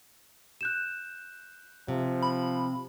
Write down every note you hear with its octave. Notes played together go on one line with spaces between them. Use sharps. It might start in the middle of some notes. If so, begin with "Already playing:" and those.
F#6 G6 E7
C3 F3
B5